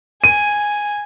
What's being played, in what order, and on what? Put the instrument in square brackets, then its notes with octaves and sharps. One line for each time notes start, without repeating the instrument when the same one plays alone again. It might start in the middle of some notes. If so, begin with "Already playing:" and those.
[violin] G#5 [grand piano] D#7